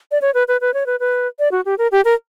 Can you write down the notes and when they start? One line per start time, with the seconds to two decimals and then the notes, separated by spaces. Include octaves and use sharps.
0.11 D5
0.22 C#5
0.34 B4
0.48 B4
0.61 B4
0.74 C#5
0.86 B4
1.00 B4
1.39 D5
1.52 F#4
1.65 G4
1.78 A#4
1.92 G4
2.05 A#4